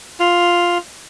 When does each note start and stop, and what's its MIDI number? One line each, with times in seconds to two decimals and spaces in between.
0.20 0.78 65